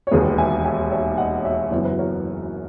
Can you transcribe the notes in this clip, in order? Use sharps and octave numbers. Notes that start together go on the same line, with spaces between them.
C#5
E1 D#2 D#3 G#4 B4
E5 G#5
E5 G#5
C#5 E5
D#5 F#5
C#5 E5
F#1 F#2 E3 B3 C#5
B4
A#4 C#5